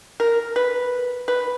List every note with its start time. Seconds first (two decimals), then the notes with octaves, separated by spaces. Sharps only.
0.20 A#4
0.56 B4
1.28 B4